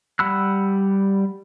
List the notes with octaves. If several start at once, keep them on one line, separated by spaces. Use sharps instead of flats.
G3 F#5 B5 E6 F#6